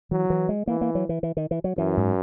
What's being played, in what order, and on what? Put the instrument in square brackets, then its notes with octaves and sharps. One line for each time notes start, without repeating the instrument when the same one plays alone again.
[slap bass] E3 [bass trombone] F#3
[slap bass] E3
G#3
[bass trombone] E3 [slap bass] A#3
[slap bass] A#3
F#3
E3
E3
D#3
E3
F#3
[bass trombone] F#2 [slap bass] E3
[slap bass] G#2